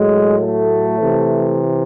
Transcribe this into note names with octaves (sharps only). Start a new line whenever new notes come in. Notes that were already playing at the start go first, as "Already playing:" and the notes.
Already playing: A2 F#3 G#3
A3
C3 E3